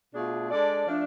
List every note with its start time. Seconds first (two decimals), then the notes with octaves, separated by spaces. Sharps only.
0.14 B2 A3 D4 F4 G#4
0.50 G#3 D4 A4 D5
0.87 F3 A3 D4